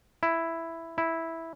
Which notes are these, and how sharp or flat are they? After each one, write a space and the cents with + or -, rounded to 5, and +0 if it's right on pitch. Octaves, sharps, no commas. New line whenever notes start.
E4 +5
E4 -5